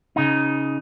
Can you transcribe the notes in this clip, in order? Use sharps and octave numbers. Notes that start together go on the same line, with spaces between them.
C#3 D#4